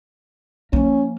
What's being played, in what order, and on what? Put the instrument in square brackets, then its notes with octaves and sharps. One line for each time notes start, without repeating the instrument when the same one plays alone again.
[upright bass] F3 A#3 [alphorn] C#4